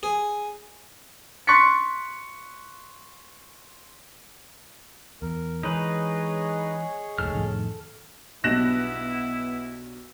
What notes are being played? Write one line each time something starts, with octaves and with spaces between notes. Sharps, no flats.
G#4
C6 C#6 F#6 A6 B6 C#7
E2 A#4
E3 G#3 D#4 G#4 B4 C#5
F1 D2 G#2 A4 F6
F2 A2 D#3
B1 G2 B3 E4 F#6 A#6 E7 F#7